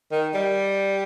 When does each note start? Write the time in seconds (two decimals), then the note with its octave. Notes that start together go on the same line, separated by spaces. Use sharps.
0.12 D#3
0.35 G3